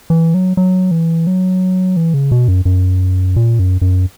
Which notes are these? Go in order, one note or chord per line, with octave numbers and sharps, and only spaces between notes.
E3
F#3
F#3
E3
F#3
E3
C#3
B2
F#2
F#2
A#2
F#2
F#2